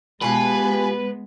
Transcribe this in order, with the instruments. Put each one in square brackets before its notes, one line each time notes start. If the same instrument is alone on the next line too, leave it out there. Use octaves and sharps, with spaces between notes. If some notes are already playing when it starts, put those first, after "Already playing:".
[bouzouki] B2 F4 G4 [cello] G#3 B3 [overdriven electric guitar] B4 [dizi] G#5